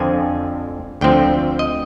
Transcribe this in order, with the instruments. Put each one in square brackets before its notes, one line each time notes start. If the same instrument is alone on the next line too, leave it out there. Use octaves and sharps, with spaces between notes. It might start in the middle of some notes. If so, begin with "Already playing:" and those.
Already playing: [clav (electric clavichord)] F2 D3 F3 C4 G#5
D2 D3 F3 C4 G5
D#5